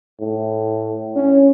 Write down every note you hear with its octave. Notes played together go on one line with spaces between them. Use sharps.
A2
C#4